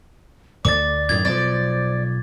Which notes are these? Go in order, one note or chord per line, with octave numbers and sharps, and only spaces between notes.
D2 D5 D6 A6
F#2 A2 D#3 G#6
B1 F3 C5 D5